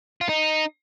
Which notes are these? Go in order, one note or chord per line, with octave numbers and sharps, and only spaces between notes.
F4
D#4